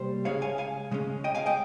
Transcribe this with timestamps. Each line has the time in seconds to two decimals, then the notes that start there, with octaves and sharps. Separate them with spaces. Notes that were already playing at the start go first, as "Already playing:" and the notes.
Already playing: C3 G3 A#3 C5
0.25 C#3 G#3 C#4 C#5 F5
0.42 F5 G#5
0.58 F5 G#5
0.91 C#3 G#3 C#4
1.24 D#5 G5
1.35 F5 G#5
1.46 D#5 G5